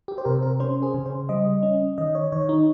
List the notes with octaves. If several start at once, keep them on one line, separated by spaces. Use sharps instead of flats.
G4
C5
C3 A#4
A#4
C#4 C5
G#4
C#3
C5
G3 D#5
C#4
D#3 D#5
C#5
D#3 C#5
D#4